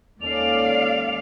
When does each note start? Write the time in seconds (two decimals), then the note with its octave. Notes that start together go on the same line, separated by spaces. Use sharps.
0.21 D#2 G#3 C#4 A4 D5 F5 F7